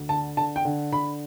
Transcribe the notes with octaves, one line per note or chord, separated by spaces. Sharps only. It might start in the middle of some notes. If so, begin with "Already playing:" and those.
Already playing: D2
D3 A5
D3 A5
G5
D3
D3 B5